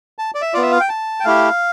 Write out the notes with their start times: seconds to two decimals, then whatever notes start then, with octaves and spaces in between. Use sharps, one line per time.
0.18 A5
0.35 D5
0.42 E5
0.54 B3 F4 D5
0.62 E5
0.71 F5
0.80 G5
0.89 A5
1.20 G5
1.25 A3 E4 G4 F5